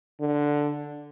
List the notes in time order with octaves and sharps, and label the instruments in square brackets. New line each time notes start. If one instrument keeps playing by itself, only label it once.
[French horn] D3